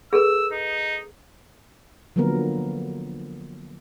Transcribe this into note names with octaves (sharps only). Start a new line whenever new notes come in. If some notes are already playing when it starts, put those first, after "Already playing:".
G#4 A4 B4 E6
D#4
D3 F3 F#3 A#3 B3 A#4